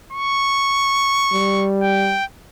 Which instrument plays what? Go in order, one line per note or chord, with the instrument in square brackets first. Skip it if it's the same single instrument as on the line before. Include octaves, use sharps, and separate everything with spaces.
[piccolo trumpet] C#6
[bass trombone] G3
[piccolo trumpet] G5